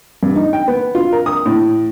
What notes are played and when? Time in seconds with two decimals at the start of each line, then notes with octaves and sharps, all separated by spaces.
0.23 G2
0.36 D#4
0.53 G5
0.68 B3
0.95 F4
1.13 A#4
1.26 D#6
1.46 A2